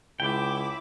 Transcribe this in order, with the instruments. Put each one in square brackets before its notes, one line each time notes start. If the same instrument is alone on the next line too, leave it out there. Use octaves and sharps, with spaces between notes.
[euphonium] C#2 [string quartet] E4 D6 [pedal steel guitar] G5